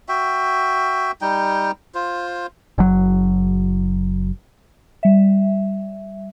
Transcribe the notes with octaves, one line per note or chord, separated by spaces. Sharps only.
F#4 E5 G5
G3 D#4 G5
F4 C5
F#1 F#3
G3 E5